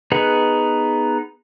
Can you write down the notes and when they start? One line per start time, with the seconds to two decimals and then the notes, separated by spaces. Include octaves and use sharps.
0.12 B3 D#4 G#4 B4 F#5